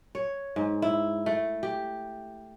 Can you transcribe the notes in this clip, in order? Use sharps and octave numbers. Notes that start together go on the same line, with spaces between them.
C#5
G#2
E4
A3
G4